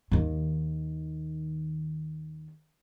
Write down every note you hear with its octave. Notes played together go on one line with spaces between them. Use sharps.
D#2 D#3